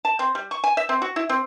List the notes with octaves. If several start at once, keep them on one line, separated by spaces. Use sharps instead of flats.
A5
C4
G3
C#6
G#5
E5
C4
F#4
E4
C4